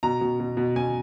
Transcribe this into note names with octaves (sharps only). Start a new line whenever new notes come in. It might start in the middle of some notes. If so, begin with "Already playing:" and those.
B2 A#5
B2
B2
B2
B2 G#5